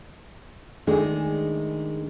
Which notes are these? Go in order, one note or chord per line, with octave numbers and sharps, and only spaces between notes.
D#3 G#3 A3 D4 G#4